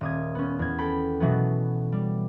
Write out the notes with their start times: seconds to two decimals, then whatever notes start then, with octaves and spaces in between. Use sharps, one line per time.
0.01 D#1 D#6 G#6
0.35 B3 C#4
0.59 E2 G#6
0.78 A4 G5 B5
1.20 B2 E3 F#3 B3
1.92 G3